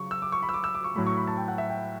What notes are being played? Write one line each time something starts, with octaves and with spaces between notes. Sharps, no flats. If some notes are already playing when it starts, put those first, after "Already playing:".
Already playing: C#3 F#3 C#6
E6
D6
C#6
B5
E6
D6
E6
D6
C#6
A2 F#3 A3 B5
C#6
B5
A5
G5
F#5
E5
G5